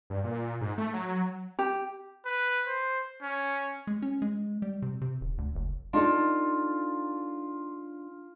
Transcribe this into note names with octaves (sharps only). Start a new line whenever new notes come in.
G2
A#2
G#2
A3
F#3
G4
B4
C5
C#4
G#3
C#4
G#3
G3
C3
C3
D#1
D2
F#1
D4 D#4 F4 A4